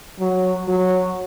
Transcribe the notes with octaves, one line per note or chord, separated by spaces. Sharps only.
F#3
F#3